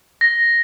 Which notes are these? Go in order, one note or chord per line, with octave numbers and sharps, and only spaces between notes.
A#6